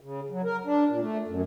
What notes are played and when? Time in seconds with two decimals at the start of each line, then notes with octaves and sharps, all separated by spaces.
0.01 C#3
0.30 F#3
0.44 A#4
0.65 D4
0.89 A#2
1.01 A3
1.28 F#2